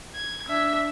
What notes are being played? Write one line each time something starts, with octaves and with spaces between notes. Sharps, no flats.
G#6
D4 E5